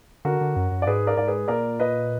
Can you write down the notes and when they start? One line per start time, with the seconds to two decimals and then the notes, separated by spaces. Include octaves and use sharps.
0.25 D3 F#4 A#4
0.41 D3
0.56 F#2
0.72 F#2
0.82 D5
0.87 G#2 G#4 B4
1.07 A#4 D5
1.17 G#2 D5
1.28 G#4 B4
1.48 A#2 A#4 D5
1.80 B4 D#5